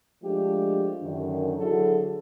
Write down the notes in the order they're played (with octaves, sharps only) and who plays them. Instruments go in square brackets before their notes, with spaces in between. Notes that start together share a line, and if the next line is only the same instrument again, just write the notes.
[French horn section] F3 G#3 A3 D4 F4 G4
F#2 D3 D#3
D3 F#3 E4 F#4 G#4 A4